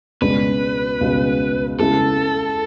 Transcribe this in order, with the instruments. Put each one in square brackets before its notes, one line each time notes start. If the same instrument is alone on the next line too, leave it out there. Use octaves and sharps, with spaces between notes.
[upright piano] C#2 B2 G#3 D4 F#4 [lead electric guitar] B4
[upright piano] C#2 B2 G#3 D4 F#4
[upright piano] C#3 G#3 B3 E4 G#4 [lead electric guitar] A4